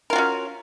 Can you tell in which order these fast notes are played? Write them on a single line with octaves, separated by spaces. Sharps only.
A#4 F4 F#4 C#4